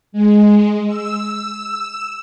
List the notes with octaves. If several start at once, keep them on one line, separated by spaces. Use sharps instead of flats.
G#3
E6